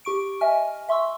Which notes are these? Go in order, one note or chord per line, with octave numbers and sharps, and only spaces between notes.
G4 C#6 D7
D#5 E5 G#5 F6
E5 C6 C#6 E6